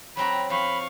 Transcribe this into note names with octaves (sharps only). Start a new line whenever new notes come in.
F#3 C4 F#4 A#5 B5
F2 F5 B5 C#6